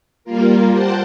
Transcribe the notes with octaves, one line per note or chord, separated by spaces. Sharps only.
G3 A#3 F4 A#4
C5 F#5 G5 A5